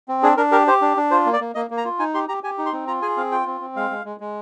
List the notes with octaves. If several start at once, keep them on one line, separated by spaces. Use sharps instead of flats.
C4
D4 G#4
D4 A#4
G4 A#4
G4 C5
D4
D4
F4 C5
A#3
D5
A#3
A#3 D#5
A#3
A#5
F4
D#4 G#5
G4 C6
G4 A#5
G4 G#5
D#4
C6
C4
F4 A#5
G#4 G#5
C4 F5
F4 G5
C4
C4
G#3 F5
G#3
G#3
G#3